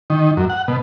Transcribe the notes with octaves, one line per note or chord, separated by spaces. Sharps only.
D#3
F#2
F#5
B2